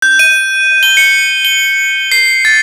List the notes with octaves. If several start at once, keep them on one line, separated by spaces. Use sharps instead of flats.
G6
D#7
G7
C#7
G7
C7
A6